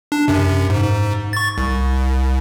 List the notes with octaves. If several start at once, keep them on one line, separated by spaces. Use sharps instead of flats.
D4
F#2 C3
G#2
C#6 A6
C2